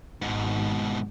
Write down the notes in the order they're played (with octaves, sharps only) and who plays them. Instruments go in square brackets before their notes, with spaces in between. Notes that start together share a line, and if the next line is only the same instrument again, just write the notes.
[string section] G#1 [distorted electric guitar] G#2 B2